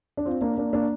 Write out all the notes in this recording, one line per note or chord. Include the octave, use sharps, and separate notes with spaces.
D4
C4 F4
A#3 D4
A#3 D4
A#3 D4